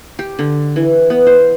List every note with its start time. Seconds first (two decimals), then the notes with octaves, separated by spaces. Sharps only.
0.19 G4
0.39 D3
0.76 E3
1.10 B3
1.27 C5